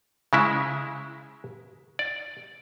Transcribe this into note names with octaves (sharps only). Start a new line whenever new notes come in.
C#3 G#3 E4
D5